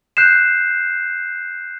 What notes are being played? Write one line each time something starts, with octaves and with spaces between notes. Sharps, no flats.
F#6 G6 C7 E7